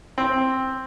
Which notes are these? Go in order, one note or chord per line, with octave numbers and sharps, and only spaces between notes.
C4